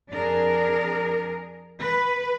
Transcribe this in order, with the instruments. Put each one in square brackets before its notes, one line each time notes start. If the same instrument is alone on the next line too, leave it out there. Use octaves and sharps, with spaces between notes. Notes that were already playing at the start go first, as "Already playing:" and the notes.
[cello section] F2 D4 G#4 A#4
B4